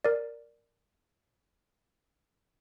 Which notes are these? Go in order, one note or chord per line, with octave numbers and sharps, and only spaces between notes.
A#4 D5